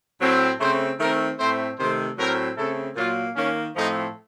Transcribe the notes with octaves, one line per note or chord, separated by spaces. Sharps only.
A2 F#3 C4
C#3 A3 C4 C5
D#3 A3 C4 A#4
A2 A3 C4 C5
C3 D#3 A3 C4 C5
A2 F#3 C4 A#4
C#3 A3 C4 A4
A#2 F#3 A#3 F4
D#3 A#3 C#4
A2 F3 A3 C4 D#4